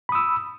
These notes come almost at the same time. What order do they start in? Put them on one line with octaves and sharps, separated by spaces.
B5 D#6 E6